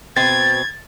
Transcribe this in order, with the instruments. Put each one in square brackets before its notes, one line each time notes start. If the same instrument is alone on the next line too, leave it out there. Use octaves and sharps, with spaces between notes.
[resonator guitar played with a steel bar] B2 C4 [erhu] G#6 [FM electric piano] A6